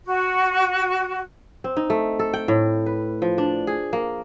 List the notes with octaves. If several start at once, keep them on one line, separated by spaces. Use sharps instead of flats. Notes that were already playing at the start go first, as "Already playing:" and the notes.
F#4
C4
D#4
A3
A4
G5
A2
B4
F3
D4
G#4
A#3